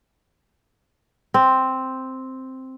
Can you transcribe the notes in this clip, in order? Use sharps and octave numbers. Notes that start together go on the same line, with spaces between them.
C4